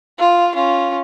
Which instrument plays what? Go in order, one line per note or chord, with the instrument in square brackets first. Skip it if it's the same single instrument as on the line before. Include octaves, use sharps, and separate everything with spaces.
[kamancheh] F4 F5
C#4 F4